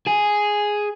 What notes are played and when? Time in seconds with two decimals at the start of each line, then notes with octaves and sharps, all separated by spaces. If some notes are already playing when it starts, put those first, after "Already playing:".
0.07 G#4 G#5